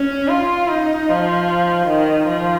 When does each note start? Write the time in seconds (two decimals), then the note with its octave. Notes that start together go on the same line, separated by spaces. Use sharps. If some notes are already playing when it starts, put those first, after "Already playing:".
Already playing: C#4
0.28 F4
0.68 D#4
1.09 F3
1.87 D#3
2.27 F3